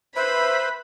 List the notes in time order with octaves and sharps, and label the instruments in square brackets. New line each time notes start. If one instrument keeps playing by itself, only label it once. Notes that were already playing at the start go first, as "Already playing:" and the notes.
[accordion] B4 C5 [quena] E5 [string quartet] B5